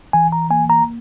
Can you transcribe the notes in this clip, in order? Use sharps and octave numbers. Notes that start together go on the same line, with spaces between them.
E3 G#5
A#5
A#3 G#5
A#5